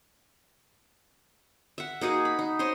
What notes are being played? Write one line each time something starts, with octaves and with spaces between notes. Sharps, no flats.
E5 F#5
A#3 D#4 F#4 G#4
B5
D#4
C5 C#5 D#5 C6